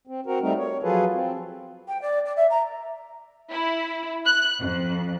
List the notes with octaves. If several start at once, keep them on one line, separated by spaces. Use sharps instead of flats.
C4
C4 F#4 A#4
G3 A3 C4 D#4 A#4
C#5
F3 F#3 F4 G#4 A4 B4
C4
G5
D5
D5
E5
A#5
E4
F#6
F2